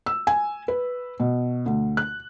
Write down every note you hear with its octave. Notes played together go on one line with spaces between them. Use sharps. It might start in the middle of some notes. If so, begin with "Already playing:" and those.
E6
G#5
B4
B2
D2
F#6